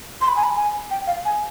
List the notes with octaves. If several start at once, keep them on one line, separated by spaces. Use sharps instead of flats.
C6
B5
G#5
B5
G#5
G5
F5
G#5